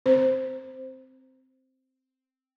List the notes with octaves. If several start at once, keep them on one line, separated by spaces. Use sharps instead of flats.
C4 C5